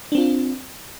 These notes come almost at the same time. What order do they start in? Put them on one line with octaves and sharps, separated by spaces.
D4 C4 F4